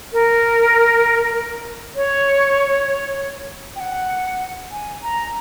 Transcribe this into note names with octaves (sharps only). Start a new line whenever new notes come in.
A#4
C#5
G5
F#5
G#5
A#5